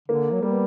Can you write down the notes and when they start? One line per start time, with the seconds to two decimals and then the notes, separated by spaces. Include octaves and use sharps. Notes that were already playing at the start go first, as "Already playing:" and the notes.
0.08 D3 A#3
0.33 F#3
0.42 G3 A#3
0.50 B3